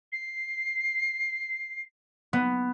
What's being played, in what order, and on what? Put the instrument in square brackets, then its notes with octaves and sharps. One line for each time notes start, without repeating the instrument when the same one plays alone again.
[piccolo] C7
[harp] B3